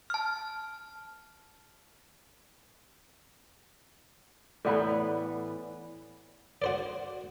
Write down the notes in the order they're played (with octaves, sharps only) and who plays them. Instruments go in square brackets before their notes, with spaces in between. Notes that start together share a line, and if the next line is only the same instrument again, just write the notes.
[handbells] A5 F6
[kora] A2 E3 B3 [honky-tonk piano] D5 F#5 B5
[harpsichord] F#4 C5 D5